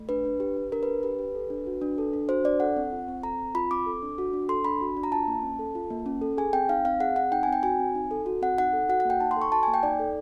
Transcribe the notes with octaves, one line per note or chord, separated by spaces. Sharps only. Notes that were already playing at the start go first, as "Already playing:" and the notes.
Already playing: A3
D4 B4
D4
G4
G4
D4 A#4
B4
D4
G4 B4
G4
A4
D4
F#4
D4
A4
D4
F#4 C5
D4 D5
A4 F#5
C4
F4
C4
A4 A#5
C4
F4 B5
C4 D6
A4
D4
F#4
D4
A4 C6
D4 B5
F#4
D4
A#5
F4 A5
A#3
C#4
A4
F4
A#3
C#4
A4
G#4 G#5
C4 G5
D#4 F5
C4 F5
G#4 F#5
C4 F#5
D#4 G5
C4 G#5
G5
F#4 G#5
C4
D#4
A4
F#4
C4 F#5
D#4 F#5
A4
F#4 F#5
F#5
A#3 G5
D#4 A5
C6
A4 C#6
F#4 A5
G#5
A#3
G5
D#4 D5
A4